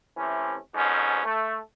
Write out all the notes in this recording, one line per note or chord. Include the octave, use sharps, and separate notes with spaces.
C3 E3 A3 C#4
F2 G#2 B2 C#4
A3